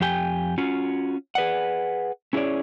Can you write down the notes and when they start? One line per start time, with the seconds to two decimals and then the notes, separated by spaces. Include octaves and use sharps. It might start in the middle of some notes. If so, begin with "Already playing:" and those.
0.01 F2 G4 G5 G#5
0.58 C#4 F4 F#4
1.35 G#4 B4 D5 F#5
2.33 C#4 E4 G#4 A4 C#5 D5